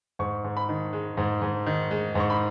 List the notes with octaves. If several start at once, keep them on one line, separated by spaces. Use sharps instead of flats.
G#2 C#6
G#2
B5
D#3
G#3
G#2
G#2
D#3
G#3
G#2 C#6
B5